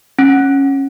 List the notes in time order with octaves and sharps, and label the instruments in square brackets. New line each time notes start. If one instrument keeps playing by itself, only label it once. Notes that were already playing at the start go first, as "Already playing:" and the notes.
[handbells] C#4